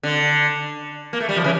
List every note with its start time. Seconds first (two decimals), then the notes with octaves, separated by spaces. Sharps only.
0.03 D3
1.13 A#3
1.20 A3
1.29 G3
1.36 F3
1.44 C#3 E3